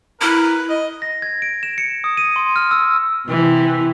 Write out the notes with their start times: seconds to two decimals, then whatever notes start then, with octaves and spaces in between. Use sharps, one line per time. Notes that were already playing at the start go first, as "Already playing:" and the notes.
0.21 E4 A#4 B4
0.70 D#5
1.02 A#6
1.22 G#6
1.42 D7
1.63 E7
1.78 C#7
2.04 D#6
2.17 D#7
2.36 C6
2.56 F6
2.71 E6
3.28 C3 E3